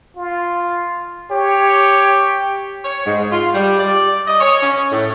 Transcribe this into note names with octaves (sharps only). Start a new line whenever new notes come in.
F4
G4 C#5
C#5
G#2
F4
G3
D5
D#5
C#5
C#4
A2